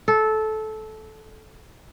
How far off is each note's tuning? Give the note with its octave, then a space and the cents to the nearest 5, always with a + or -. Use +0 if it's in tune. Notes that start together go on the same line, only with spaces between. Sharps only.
A4 -15